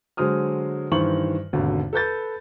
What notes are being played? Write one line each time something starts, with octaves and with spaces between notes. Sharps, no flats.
D3 F#3 G#3 C5 D#6 F6
G2 D#3 E3 C5 C#6 F#7
G#1 D#2 B2 D3
A4 B4 G6 A6